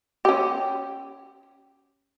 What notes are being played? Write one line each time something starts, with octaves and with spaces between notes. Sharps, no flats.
C#4 G4